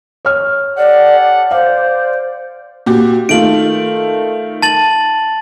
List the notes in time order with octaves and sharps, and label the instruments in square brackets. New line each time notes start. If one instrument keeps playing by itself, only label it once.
[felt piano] C#5 F6
[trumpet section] G4 A4 F#5 [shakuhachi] D5
[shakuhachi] C5 [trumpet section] D5 [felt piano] F5
[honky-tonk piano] A#2 F#4 G4
[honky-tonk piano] D#3 A3 F4 [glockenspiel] D7 F#7
[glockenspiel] A5 A6 F#7